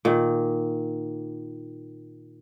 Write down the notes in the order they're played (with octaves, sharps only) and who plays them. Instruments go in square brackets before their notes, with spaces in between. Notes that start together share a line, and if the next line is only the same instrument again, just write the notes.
[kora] A#2 D#3